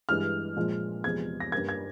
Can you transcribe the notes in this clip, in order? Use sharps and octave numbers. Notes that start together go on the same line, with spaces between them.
G2 E3 G#3 F6
A#2 F3 G#3
E2 C3 F3 G#3 G#6
A#6
G2 G3 A#3 G#6
G#6